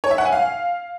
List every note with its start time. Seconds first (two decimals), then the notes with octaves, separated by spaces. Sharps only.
0.04 C#5
0.11 E5
0.18 F#5
0.25 G#5
0.32 F5